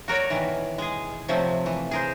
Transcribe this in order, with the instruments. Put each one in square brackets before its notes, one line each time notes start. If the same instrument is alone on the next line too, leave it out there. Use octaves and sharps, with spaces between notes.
[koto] F#4 A#4 C#5 D5
B2 D#3 E3
G#3 G#4
C3 F3 F#3 A3 C4
E3
G#4 A#4 C5